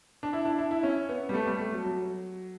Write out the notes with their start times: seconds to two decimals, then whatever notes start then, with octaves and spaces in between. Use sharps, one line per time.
0.23 D4
0.33 E4
0.45 D4
0.58 E4
0.71 E4
0.83 C#4
1.09 B3
1.29 G3
1.34 A3
1.47 G3
1.59 A3
1.72 F#3
1.84 F#3